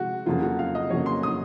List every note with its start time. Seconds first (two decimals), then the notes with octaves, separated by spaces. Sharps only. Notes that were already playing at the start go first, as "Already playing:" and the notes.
Already playing: C3 F3 G#3 F#4
0.26 F2 C#3 F#3 A#3 F4
0.43 F#4
0.59 F5
0.75 D#5
0.90 F2 C#3 F#3 A#3 C#5
1.06 C6
1.23 D#6